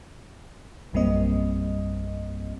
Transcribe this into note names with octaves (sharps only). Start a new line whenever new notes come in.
A#1 F#2 G3 A#3 C4 D#5